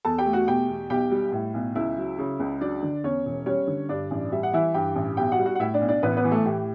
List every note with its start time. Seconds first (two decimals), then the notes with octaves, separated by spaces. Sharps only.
0.05 E2 A4 A5
0.18 G4 G5
0.26 A3
0.33 F#4 F#5
0.47 B2 G4 G5
0.68 E2
0.90 B1 G4 G5
1.11 G3
1.32 A2
1.54 B1
1.75 C#2 E4 E5
1.97 F#3
2.19 C#3
2.40 C#2
2.61 F#3 D4 D5
2.83 D3
3.03 E2 C#4 C#5
3.25 E1
3.46 G3 C#4 C#5
3.67 D3
3.89 G2 D4 D5
4.11 A1
4.32 G3 E5
4.43 F#5
4.53 E3 E4 E5
4.74 G2 G4 G5
4.95 A1
5.17 B1 G4 G5
5.32 F#4 F#5
5.39 G3
5.45 F#4 F#5
5.55 F#5
5.60 A2 E4 E5
5.74 D4 D5
5.81 B1
5.88 D4 D5
6.03 A1 B3 B4
6.17 B3 B4
6.24 E3
6.31 A3 A4
6.45 A2 G4